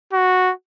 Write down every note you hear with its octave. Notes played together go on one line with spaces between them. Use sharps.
F#4